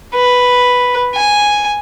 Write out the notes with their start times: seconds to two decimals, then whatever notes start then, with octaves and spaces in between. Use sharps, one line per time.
0.15 B4
1.15 G#5